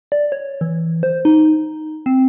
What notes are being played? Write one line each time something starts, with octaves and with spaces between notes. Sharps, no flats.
D5
C#5
E3
C5
D#4
C4